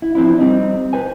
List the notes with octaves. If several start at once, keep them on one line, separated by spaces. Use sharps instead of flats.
E4
F3 C4 D4 E4
G3 C4 D#4
B4 C5 G#5